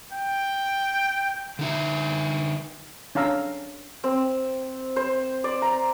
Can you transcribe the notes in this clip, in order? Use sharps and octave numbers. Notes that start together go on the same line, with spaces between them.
G5
D3 D#4 E5
C#4 D4 F5 A#5 E6
C4
C5
D5
A#5